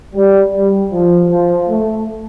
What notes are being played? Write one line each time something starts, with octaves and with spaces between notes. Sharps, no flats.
G3
G3
F3
F3
A3